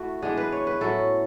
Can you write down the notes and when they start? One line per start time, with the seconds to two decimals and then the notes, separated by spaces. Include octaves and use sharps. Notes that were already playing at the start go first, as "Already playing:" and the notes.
Already playing: A3 E4 F#4
0.22 E3 G#3 B3 D4 G#4
0.37 B4
0.52 C#5
0.67 B4
0.81 A2 F#3 C#4 E4 A4